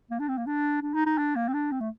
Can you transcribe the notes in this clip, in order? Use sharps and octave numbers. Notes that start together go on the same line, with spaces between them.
A#3
D4
C4
A#3
D4
D4
D#4
D#4
D4
A#3
C4
D4
C4
A3